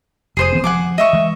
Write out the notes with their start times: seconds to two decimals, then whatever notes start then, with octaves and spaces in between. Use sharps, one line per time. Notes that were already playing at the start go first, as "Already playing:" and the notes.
0.37 F1 G#4 C5 D#6
0.52 E3 B3 C4
0.64 F3 F#5 G#5 D6
0.98 D#5 E5 C#6
1.13 E3 G#3